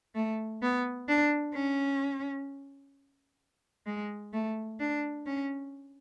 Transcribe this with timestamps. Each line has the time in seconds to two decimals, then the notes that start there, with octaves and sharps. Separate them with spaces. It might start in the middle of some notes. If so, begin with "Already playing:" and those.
0.15 A3
0.62 B3
1.08 D4
1.54 C#4
3.86 G#3
4.33 A3
4.80 D4
5.26 C#4